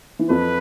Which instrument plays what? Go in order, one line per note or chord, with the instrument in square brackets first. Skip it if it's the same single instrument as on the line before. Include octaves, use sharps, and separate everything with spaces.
[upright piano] E3
[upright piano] F2 F3 [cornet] B4